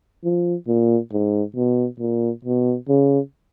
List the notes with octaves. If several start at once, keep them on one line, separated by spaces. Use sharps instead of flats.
F3
A#2
G#2
B2
A#2
B2
C#3